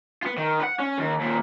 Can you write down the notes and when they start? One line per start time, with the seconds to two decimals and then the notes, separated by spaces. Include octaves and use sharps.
0.23 B3 F4
0.38 D#3
0.61 B4 F#5
0.80 C#4
0.98 D#2
1.21 D#2 A#2